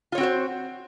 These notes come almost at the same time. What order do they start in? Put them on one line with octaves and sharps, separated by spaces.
F4 C#5 C4 F#4 C5